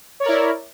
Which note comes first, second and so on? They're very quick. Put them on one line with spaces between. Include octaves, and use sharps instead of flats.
C#5 D5 A#4 E4